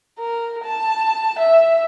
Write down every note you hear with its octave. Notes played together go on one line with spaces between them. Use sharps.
A#4
A5
E5